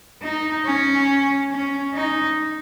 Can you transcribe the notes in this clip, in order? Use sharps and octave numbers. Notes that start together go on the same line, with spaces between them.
D#4
C#4
C#4
D#4